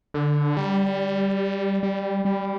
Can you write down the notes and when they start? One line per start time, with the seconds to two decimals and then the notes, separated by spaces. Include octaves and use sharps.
0.14 D3
0.57 G3
1.83 G3
2.25 G3